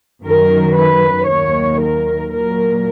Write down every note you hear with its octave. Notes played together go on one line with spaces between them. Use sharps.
F#2 D#3 F#3 A#4
B4
D#2 D#3 F#3 C#5
A#4
A#2 F#3 A#4